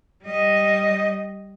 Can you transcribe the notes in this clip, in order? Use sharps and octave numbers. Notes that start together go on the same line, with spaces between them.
G3 D#5